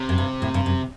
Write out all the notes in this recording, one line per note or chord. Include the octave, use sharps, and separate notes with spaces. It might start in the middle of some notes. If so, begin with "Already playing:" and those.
Already playing: C3
F#2
G2
A2
G2
F#2